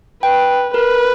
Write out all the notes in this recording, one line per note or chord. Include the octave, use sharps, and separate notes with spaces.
B4 G5
A#4 B4